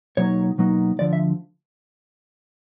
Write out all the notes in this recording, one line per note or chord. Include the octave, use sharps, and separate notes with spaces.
B2 F#3 A#3 D#4 C#5
B2 F#3 A#3 D#4
D2 D3 F3 D5
E5